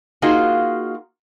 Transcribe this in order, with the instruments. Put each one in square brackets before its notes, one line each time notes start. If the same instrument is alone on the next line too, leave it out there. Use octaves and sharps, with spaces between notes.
[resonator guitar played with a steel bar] A#3 D#4 F4 F#4 G#4